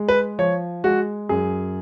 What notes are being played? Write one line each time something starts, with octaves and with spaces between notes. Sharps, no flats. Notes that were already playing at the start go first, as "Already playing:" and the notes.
Already playing: G#3
B4
F3 C#5
G#3 F#4
F#2 G#4